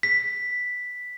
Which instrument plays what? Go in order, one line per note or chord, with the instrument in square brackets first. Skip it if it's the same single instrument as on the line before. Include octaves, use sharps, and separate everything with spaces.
[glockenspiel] B6